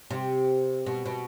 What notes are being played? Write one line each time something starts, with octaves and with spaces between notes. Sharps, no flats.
C3
B2
B2